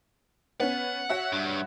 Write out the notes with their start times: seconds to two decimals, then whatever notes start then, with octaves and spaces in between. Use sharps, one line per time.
0.60 B3 C#4 F#5
1.09 F#4 C#5 E5
1.33 G2